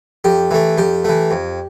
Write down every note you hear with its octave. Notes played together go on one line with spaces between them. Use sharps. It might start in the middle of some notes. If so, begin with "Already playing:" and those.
F2 G4
E3 A3
F2 G4
E3 A3
F2